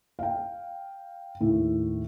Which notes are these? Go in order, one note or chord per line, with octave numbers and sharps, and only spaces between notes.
F5 G5
D#2 A2